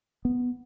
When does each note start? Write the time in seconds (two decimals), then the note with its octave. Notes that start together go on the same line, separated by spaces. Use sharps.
0.25 B3